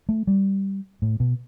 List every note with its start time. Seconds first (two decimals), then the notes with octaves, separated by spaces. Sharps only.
0.09 A3
0.27 G3
1.02 A2
1.20 B2